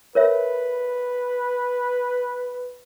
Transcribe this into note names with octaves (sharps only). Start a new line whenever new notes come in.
A#4 B4 C#5 E5